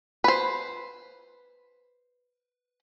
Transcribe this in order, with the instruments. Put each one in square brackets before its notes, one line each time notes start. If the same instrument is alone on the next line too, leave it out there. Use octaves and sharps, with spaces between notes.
[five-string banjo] B4 C5